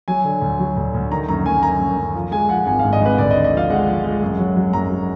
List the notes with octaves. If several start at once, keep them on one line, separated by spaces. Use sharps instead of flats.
F#3 G#5
D3
D2
F#3
D2
D2
D#3 A#5
F#2 A#5
F#2 G#5
F#2 A#5
F#2
F#2
F3
G#3 G#5
F3 F#5
G#1 G#5
G#2 F5
D#5
G#1 B4
D2 D5
D3 D#5
D#5
F3 F5
G#3 F#5
F3
G#3
F#2
F#3
F#3
F#2 A#5
F#3